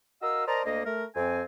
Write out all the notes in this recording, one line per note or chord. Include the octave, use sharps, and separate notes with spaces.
F#4 A#4 D#5 F5 E6
A#4 C5 D5 D#5 A5 A#5
D2 A#3 D#5
A3 A#4
F2 C4 G#5